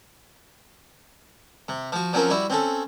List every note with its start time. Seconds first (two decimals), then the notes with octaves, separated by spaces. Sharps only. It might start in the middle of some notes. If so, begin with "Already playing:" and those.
1.68 C3
1.92 F3 F#4
2.13 F3 F#3 C4 C#4 A#4
2.30 G3 E4 F#4
2.50 C4 C#4 A4